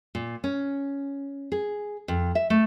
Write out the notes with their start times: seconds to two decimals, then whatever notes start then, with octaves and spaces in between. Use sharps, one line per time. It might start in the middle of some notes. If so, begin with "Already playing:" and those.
0.15 A#2
0.44 C#4
1.52 G#4
2.08 F2
2.35 E5
2.50 A3